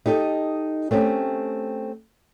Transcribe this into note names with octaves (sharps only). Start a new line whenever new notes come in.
D#4 G4 A4 D#5
A3 C4 C#4 G4